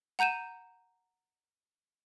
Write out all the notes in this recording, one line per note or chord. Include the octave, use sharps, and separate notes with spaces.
F#5 A#5 G6 D#7 E7